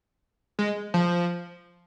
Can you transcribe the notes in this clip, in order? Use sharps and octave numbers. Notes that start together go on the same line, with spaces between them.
G#3
F3